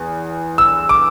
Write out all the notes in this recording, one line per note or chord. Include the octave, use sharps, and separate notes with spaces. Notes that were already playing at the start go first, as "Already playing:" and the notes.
Already playing: E2
E6
D6